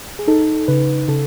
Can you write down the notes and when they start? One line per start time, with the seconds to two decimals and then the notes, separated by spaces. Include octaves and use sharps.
0.19 G#4
0.27 D#4 A4
0.68 C#3 B4
1.08 C#3 A4